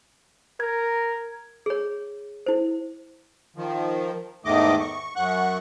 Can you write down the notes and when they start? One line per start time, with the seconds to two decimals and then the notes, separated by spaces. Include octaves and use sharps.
0.60 A#4 G#6
1.66 G#4 C#5
2.46 E4 C5
3.56 D#3 F3
4.45 E2 G#2 D#3 A3 D#5 D6
4.80 C#6
5.16 F#2 F#5 C#6 F#6